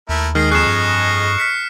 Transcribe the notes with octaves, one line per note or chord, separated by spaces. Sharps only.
D#2 A3 E4 A#4
D#3 G#3 D#5 F6 C7
F2 G#4 D#5 C#6 F#6 C7 E7
G2
F6 B6 C#7